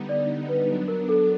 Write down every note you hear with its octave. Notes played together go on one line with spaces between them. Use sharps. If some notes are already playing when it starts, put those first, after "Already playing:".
Already playing: D3 G3 B3 D#4
D5
B4
F#3 B3 D4
A#4
A4